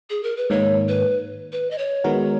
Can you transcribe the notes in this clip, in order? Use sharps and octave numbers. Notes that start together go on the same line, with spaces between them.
G#4
A#4
B4
G#2 D#3 A#3 C#5
B4
B4
D#5
C#5
D#3 G#3 B3 F#4 A#4